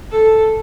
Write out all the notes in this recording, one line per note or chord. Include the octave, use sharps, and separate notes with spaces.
A4